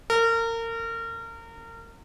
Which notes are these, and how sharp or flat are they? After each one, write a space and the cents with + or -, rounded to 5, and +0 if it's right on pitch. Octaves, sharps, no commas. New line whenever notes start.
A#4 -30